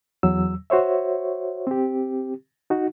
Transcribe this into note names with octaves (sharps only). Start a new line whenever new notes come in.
E2 F#3 E6
F#4 C5 C#5 E5
C4 G4
D#4 F#4